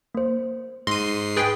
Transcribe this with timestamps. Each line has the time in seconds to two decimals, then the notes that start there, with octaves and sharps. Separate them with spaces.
0.15 A#3 C5
0.87 G#2 C6 A#6 C7 D#7
1.37 G#4 B4 G5 A6